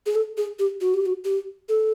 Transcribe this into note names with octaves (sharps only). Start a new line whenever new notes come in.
G#4
A4
G#4
G4
F#4
G4
F#4
G4
A4